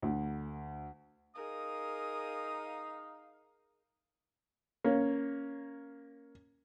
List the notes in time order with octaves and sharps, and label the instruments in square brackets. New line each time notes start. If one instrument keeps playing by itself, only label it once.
[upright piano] D2
[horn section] D#4 F5 [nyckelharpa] G#4 A#4 [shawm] D#6
[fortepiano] A#3 C#4